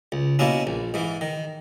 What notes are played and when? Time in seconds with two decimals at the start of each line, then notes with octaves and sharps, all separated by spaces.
0.12 C#2
0.39 B2 A#3 C#4 E4
0.67 A#1
0.94 G#2 E3
1.21 D#3